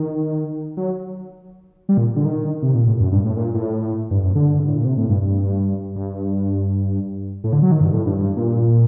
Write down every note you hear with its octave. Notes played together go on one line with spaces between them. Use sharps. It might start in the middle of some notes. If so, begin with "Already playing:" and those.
Already playing: D#3
F#3
G3
A#2
D3
D#3
C3
A#2
A2
F#2
G2
A2
A#2
A2
G2
F#2
D3
G2
A2
A#2
C3
A2
G2
G2
G2
A2
D3
F#3
D#3
G2
A2
G2
G2
A#2